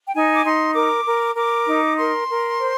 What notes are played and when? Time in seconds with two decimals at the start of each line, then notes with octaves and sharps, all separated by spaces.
0.06 G5
0.14 D#4 G#5
0.34 D6
0.45 D#4 C6
0.75 A#4 D6
1.06 A#4
1.36 A#4 D6
1.67 D#4
1.97 A#4 C6
2.28 A#4
2.59 C5